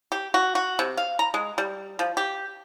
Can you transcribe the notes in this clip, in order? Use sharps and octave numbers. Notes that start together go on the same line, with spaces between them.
G4
F#4
F#4
C3
F5
A#5
G#3
G3
F3
G4